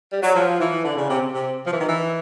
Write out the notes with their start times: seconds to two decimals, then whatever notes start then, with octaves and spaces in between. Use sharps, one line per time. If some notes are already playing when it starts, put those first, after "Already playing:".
0.11 G3
0.23 F#3
0.35 F3
0.59 E3
0.84 D3
0.96 C#3
1.09 C3
1.33 C3
1.67 F3
1.73 E3
1.80 D#3
1.87 E3